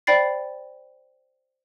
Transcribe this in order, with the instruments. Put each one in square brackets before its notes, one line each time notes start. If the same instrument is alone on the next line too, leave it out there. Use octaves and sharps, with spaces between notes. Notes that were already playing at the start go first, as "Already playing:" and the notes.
[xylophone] C5 D5 G5 B5 A6 C7